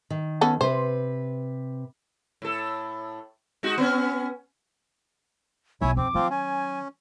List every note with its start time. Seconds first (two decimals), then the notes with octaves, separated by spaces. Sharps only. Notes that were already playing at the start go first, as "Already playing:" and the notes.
0.10 D#3
0.41 B3 C#4 A4
0.61 C3 B4 C5
2.42 A2 A4
3.63 G#3 D#4 F#4
3.78 B3 C#4
5.81 B1 E4 C#5 E5 G#5
5.97 F2 C4 D6
6.15 D#3 F3 F#3 C4 F4
6.30 C#4 G#5